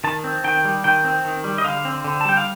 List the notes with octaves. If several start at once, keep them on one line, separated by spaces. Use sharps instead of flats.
D#3 A5
C4
D#3 G5
G3
D#3 G5
C4
D#3
G3
D#5
D3 F5
C4
D3
A5
G3 G5
F5